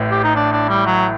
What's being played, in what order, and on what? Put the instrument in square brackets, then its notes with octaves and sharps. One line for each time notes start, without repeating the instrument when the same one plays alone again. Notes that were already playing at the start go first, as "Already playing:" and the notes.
Already playing: [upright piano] A1 A2
[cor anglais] G4
D#4
D4
D4
G3
F#3